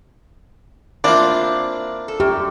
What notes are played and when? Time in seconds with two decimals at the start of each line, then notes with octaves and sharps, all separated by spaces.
1.04 A#3 C4 D4 E4 F4 D5
2.08 A4
2.20 F#2 G4